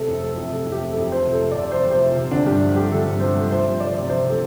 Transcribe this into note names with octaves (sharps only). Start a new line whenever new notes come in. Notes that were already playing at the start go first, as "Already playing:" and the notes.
Already playing: C3 A3 A4
F2
A3 A4
F2
C3 A4
F2
G4
A3
A4
F2
F3 C5
C3
A4
A3
C3 D5
F3 C5
C3 C5
A3
F4
C3
D3 D4
G2 G4
F3
A3 G4
D3 A4
G2
F3 C5
A3
F3 C5
C3
A3 D5
C3
F3 C5
C3 A4